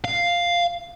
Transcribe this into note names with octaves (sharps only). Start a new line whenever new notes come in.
F5